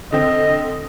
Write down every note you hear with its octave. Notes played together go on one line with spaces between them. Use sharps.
D3 C4 D#5